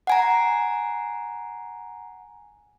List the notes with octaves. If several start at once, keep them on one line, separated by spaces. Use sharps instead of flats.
F#5 G#5 A#5